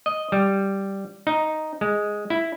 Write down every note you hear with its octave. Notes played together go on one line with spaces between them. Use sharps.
D#5
G3
D#4
G#3
E4